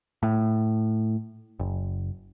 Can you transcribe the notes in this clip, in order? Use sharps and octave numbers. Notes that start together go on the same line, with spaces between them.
A2
F#1